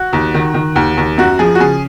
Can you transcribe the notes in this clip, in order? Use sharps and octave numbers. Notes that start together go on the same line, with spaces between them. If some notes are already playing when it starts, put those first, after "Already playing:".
Already playing: F#4
D#2
D#3
D#3
D#2
D#2
F#2 F#4
F3 G#4
F#4
C#3 G#4